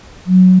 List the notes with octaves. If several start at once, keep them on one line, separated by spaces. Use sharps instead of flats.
F#3